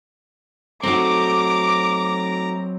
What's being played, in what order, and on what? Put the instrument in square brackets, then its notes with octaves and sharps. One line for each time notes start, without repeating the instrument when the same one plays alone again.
[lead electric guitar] F#3 C4 [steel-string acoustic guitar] A3 D#4 F#4 [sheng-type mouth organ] A#5 [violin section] D6